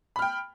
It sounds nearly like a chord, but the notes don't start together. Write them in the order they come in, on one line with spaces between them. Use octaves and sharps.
B5 F6 G5